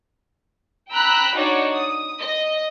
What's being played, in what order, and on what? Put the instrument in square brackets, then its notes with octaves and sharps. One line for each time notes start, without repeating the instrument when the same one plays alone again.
[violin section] G5 A#5 B5 E6 F#6
D4 D#4 F#4 C#5 D5
D#6
D#5